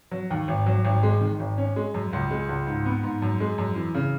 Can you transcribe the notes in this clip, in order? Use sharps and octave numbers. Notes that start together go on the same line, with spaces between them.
F#3
D#2
G#1
F#3
G#1
G#3
D#3
G#1
C#4
G#3
F#2
C#2
G#3
C#2
G#2
B3
G#2
F#2
G#3
F#2
E3
C#3